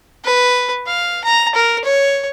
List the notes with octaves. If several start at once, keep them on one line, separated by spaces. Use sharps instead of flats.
B4
F5
A#5
A#4
C#5